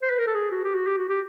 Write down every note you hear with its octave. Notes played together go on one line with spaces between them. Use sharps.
C5
B4
A#4
A4
G#4
F#4
G4
F#4
G4
F#4
G4